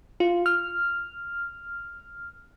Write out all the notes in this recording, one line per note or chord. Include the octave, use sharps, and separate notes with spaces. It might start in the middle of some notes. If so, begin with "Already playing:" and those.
F4
F6